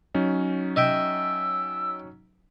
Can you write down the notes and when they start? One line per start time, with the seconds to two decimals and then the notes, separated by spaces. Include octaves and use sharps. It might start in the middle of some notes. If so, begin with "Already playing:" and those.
0.14 F#3 C#4 D#4
0.76 D#5 E5 G5 E6